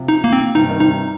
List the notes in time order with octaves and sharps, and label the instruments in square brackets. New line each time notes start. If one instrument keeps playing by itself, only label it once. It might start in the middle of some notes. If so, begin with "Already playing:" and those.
Already playing: [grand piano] C3 F3
[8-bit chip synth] D#4
A#3
C4
[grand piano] G2 C3 [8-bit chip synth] D#4
[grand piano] D#3
[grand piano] G2 C3 [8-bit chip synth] D#4